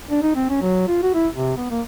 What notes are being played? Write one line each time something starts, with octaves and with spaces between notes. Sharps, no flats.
D4
D#4
C4
C#4
F#3
F4
F#4
E4
C3
B3
A#3